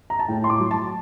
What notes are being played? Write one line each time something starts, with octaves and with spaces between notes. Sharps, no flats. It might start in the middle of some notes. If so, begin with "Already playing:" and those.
A#5
A5
A2 G5
C6
D6
F#3
A5